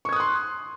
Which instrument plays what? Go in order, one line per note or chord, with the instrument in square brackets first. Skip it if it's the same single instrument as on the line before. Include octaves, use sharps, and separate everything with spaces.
[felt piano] C#6
G#6
D#6
F#6
C6